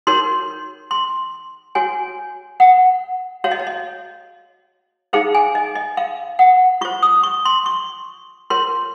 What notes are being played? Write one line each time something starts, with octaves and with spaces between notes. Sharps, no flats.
D#4 F#4 A#4 C#5 C6
C6
F#4 C#5 G#5
F#5
F#4 C#5 F5
D#5
C#5
D#5
D#4 G#4 C5 F5
G#5
D#5
D#5
F5
F#5
F4 C5 C#6
D#6
C#6
C6
C#6
F4 A#4 C#5 C6